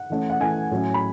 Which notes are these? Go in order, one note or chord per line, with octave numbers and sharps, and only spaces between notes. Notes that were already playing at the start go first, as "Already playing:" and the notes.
Already playing: F#5
E3 A3 C#4
F#5
E3 A3 C#4 G#5
A2 F#3 C#4
B5